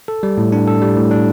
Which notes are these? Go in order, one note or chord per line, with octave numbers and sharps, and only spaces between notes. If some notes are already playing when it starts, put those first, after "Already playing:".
A4
G3
A2
D4
A4
G3
A2
D4